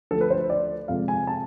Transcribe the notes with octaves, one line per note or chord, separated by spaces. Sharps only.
D2 D3 F3 A3 A4
B4
C5
D5
F2 C3 G#3 F5
G#5
A5